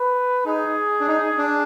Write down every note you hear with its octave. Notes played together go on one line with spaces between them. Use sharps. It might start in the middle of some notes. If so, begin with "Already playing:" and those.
Already playing: B4
D#4 G#4
D4
D#4
D4